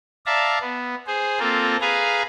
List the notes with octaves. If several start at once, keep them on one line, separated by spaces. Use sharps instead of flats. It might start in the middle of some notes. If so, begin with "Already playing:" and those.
D5 E5 F5 A5 A#5
B3
G#4 C5
A#3 C4 F4 A4 A#4
G#4 B4 F5 G#5 A#5